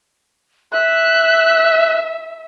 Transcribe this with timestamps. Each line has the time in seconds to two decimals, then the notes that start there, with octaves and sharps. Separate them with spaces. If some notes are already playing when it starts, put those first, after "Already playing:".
0.72 E5 F#6